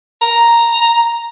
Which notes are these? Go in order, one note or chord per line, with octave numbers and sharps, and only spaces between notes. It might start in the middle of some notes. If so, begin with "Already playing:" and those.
A#5